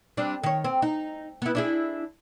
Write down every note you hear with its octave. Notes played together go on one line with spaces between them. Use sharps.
G3 C4 D4
D#3 C#5
C4
D#4
B3 E4
D4 E4 G#4